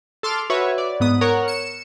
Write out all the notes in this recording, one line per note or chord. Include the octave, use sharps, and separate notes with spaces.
A4 C6 D6 F6
F#4 B4 C#5 E5
D5
G#2 B3 D#6
A#4 C#5 F#5
C#7 E7